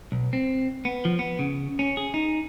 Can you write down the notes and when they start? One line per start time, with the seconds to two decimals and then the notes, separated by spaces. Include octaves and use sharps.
0.12 B1
0.33 C4
0.85 B3
1.05 F3
1.19 B3
1.39 C#3
1.79 C#4
1.97 G#4
2.14 D#4